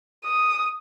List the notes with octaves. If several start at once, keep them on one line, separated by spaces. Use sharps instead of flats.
D#6